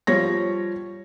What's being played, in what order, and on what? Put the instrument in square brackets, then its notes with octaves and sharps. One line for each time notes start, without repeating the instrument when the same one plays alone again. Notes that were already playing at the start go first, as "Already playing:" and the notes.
[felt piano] F3 G3 C#5 A#6